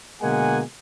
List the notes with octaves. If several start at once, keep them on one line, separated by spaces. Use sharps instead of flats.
B2 D3 G#3 A#3 F#5 G#5